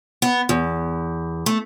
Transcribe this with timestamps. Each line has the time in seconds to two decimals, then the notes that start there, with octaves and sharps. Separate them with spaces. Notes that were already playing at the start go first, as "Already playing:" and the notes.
0.22 B3
0.49 E2
1.46 A3